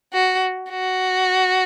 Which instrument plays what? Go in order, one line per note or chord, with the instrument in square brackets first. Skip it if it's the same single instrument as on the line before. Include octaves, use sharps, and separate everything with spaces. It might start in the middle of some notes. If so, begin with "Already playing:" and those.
[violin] F#4
F#4